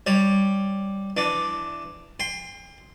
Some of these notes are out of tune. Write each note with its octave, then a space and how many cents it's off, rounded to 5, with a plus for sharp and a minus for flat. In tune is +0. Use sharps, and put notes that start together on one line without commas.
G3 +0 C#5 +0
E3 +10 D4 +0
G5 +40 C6 +0